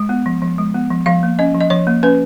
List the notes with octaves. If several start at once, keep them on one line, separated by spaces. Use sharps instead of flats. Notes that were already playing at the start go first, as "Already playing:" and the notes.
Already playing: G#3
B3
F3
F3
G#3
B3
F3
F3 F5
A#3
C#4 D#5
F3
D#5
F3 C#5
A#3
C#4 B4